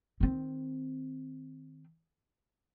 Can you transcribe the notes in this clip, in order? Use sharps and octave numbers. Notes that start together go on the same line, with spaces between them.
D#3 C4